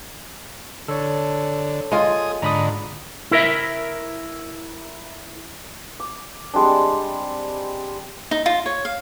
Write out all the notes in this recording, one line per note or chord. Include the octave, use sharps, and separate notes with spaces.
D3 A4 C#5
G#3 F4 G#4 D#6
G#2 D3 A#5 B5 D#6
E4 A#4 E5
D6
G3 G#3 C4 D4
D#4
F4
C#5
F5